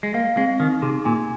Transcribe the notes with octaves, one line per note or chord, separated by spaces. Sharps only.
G#3
A#3 F5
G#3 C4
D#3 D#4
C3 G#4
A#2 G#5